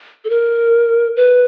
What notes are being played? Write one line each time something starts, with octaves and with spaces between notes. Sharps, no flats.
A4
A#4
B4